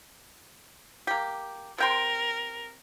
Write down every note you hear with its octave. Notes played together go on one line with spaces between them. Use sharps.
A#3 G4
C3 A#4 G5 C6